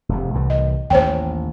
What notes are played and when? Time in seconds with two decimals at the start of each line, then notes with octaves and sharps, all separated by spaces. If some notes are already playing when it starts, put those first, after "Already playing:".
0.09 F1 G#2 C3
0.34 C2 A2 E3
0.50 D#5
0.90 A1 D#2 C5 C#5 G5